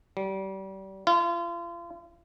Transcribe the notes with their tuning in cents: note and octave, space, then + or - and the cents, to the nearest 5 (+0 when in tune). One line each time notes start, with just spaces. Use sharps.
G3 -30
F4 -35